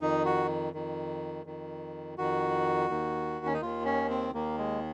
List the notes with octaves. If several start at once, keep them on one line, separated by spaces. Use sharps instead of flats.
F2 D#3 D#4
F#4
F2 D#3
F2 D#3
F2 D#3 F#4
D#2 D#3
C#4
D#4
D#2 D#3 F4
C#4
C4
D#2 D#3 A#3
G#3